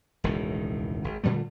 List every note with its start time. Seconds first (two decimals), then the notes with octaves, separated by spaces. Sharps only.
0.24 E1 C#2 A2 D#3
1.04 G#1
1.24 A#2 D3 G3 A3